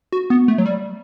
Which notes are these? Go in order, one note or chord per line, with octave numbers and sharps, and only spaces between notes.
F#4
B3
A3
F#3
G3